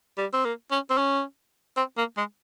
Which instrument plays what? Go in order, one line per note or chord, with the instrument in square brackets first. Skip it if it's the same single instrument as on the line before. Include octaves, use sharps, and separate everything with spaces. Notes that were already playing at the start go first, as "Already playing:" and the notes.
[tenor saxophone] G3
C4
A#3
C#4
C4
C#4
C4
A#3
G#3